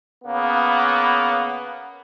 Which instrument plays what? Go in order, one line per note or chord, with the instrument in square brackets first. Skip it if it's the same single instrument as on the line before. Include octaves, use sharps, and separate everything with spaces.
[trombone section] C#3 A#3 B3